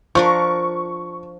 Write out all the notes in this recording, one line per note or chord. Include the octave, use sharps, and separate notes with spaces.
F3 D4 A#4 C#6